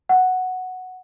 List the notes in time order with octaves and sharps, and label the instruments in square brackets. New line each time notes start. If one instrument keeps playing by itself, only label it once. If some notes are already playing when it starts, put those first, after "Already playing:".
[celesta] F#5